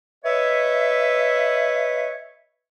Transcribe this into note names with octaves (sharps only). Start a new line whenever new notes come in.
B4 C#5 D#5 E5